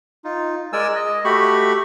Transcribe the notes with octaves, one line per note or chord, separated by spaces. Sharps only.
D#4 F4
G#3 A#4 D5 G#5 E6
D#5
A3 F#4 G4 B5 C#6